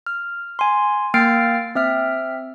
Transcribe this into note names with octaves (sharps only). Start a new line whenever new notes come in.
F6
G#5 C6
A#3 G5 F6 A6 C7 D7
C4 E5 F6